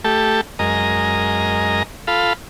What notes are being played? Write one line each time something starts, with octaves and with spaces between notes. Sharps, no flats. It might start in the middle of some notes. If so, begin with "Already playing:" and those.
A3 G4 A4
F#2 G#3 A#4 D#5 A#5
F4 A4 F5 B5